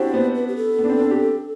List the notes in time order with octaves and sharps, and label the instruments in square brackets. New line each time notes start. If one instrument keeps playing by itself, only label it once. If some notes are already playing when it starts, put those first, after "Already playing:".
Already playing: [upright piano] C4 D4 E4 F#4 G4 [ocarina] C5
[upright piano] B3
[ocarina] B4
G4
A4
[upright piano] B3
D4
C4
D4
G4